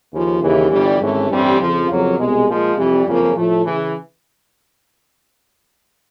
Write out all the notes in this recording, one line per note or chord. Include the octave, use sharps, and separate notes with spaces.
D#2 C#3 F3
D#2 C#3 E3
G1 G2 E3 G3
G#1 G#2 E3 A3 C#4
A1 G2 E3 G3 C4
F2 C#3 F3
F2 C#3 F#3 A#3
C2 B2 G#3
A#2 F3 G#3
F2 C3 E3 G3
F#1 F2 C#3 F3 A#3
A2 F3 A3
C#3 E3